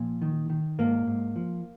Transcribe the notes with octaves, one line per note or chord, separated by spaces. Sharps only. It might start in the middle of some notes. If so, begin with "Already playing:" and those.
Already playing: A#2 F3
D#3
D#3
G#2 A#3
G#2
F3